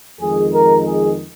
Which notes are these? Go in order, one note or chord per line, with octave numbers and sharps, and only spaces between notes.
F2 D#3 G#3 G#4
A#4
G#4